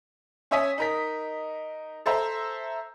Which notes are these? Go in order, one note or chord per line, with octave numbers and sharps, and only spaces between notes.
C#4 C#5 E5 G#5 D#6 B6
D#4 A#4 B6
A4 C5 E5 A#5